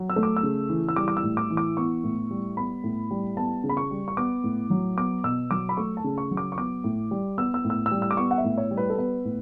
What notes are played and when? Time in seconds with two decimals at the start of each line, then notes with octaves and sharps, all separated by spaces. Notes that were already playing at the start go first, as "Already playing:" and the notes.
Already playing: F#3
0.10 E6
0.16 A3
0.23 D6
0.36 E6
0.43 C#3
0.69 E3
0.89 E6
0.96 G3 D6
1.08 D6
1.17 E6
1.23 A2
1.37 D6
1.50 E3
1.57 D6
1.77 B3 C#6
2.04 A2
2.30 G3
2.57 B3 B5
2.84 A2
3.11 G3
3.37 B3 A5
3.64 C#3
3.69 B5
3.77 C#6
3.91 G3
4.08 C#6
4.17 B3 D6
4.44 A2
4.70 F#3
4.97 B3 D6
5.24 B2 E6
5.51 F#3 D6
5.69 B5
5.77 A3 C#6
5.97 A5
6.04 C#3
6.18 C#6
6.31 F#3
6.37 D6
6.52 C#6
6.58 B3 D6
6.84 A2
7.11 G3
7.38 B3 E6
7.54 E6
7.64 A2
7.70 E6
7.86 E6
7.91 G3
8.02 E6
8.11 D6
8.17 B3 C#6
8.31 F#5
8.38 E5
8.44 A2
8.58 C#5
8.71 G3
8.77 B4
8.90 A4
8.98 B3 B4
9.25 A2